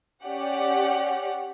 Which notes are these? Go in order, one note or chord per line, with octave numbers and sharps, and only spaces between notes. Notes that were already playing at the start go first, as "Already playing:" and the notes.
C#4 G4 D5 F#5